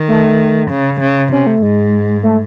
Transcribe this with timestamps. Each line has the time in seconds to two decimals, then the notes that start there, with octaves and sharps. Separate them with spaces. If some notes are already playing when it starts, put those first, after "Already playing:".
Already playing: D#3
0.08 A3
0.70 C#3
1.00 C#3
1.32 C3 C#4
1.47 A3
1.62 G#2 G#3
2.23 A3